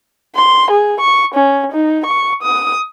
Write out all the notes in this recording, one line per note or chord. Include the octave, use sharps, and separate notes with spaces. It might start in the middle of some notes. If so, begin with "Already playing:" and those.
C6
G#4
C#6
C#4
D#4
C#6
D#6